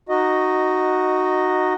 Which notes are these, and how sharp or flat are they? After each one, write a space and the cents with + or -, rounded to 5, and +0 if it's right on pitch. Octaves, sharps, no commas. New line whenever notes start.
D#4 -15 F#4 +0 D#5 +0